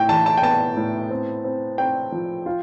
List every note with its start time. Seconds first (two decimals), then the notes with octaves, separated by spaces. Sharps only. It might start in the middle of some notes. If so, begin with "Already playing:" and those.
Already playing: A2 G5
0.09 E3 A5
0.26 A5
0.37 G5
0.43 B3 A5
0.77 A2
1.10 C4
1.44 C4
1.78 C4 G5
2.12 F3
2.46 F4